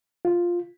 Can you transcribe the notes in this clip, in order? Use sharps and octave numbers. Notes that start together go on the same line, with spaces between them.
F4